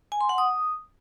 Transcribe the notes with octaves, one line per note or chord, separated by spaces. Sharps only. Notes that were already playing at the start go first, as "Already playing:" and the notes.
G#5
C6
F#5
D#6